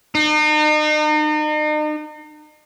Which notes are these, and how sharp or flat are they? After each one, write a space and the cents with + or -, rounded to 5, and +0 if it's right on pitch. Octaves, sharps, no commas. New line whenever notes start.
D#4 -40